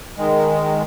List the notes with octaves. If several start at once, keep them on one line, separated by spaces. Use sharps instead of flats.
D#3 G#3